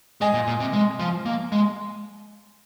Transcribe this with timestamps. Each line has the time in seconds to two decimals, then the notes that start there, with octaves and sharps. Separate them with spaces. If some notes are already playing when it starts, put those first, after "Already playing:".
0.21 G#3 D#5 G#5
0.34 A#2
0.47 A#2
0.60 C3
0.73 G#3
0.99 F3
1.25 A#3
1.52 G#3